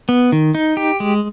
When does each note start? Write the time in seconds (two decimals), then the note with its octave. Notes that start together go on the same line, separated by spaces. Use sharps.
0.09 B3
0.32 D#3
0.55 D#4
0.77 G4
1.00 G#3